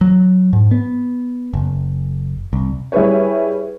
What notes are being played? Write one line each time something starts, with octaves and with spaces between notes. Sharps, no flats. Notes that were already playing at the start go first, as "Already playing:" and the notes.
F#3
G#2
B3
F#1
C2
G3 E4 G#4 B4 C#5